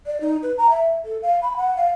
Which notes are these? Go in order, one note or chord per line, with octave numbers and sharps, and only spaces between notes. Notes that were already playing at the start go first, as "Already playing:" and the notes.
D5
D#4
B4
A#5
E5
A4
F5
B5
F#5
F5